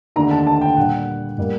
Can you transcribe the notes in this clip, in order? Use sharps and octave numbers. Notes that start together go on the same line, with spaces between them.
D#2 D3 A3 D4 A#5
A5
A5
G5
A#2 G3 D4 F#5
A2 G3 A#3